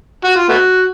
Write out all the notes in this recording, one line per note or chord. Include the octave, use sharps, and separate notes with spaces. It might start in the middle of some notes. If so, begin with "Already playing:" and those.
F#4
F4
A3 B3 F#4